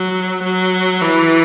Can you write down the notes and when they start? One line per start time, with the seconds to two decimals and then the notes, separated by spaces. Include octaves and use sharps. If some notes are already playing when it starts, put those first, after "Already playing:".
Already playing: F#3
0.44 F#3
1.01 E3